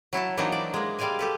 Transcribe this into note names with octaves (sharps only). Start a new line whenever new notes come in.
F#3 E4 F#4 A5
E3 F#3 A#3 C4 D4 D#4
D5
G#3 A#3
G3 G#3 D5 F5 G#5
G4 A4 B4